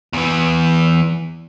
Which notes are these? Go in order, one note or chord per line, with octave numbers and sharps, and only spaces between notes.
E2 E3